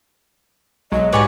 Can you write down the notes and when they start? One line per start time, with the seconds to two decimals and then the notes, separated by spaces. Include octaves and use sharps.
0.92 B1 F#3 G#3 D#5
1.13 G#2 F#4 G4 B4 C#5 D5 G#5 A5